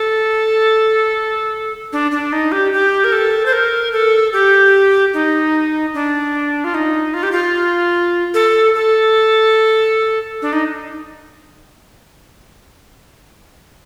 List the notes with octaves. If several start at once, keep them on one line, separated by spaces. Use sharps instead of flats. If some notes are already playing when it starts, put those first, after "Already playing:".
Already playing: A4
D4
D4
D#4
G4
G4
A#4
A4
C5
A#4
A4
G4
D#4
D4
F4
D#4
F4
G4
F4
A4
A4
D4
D#4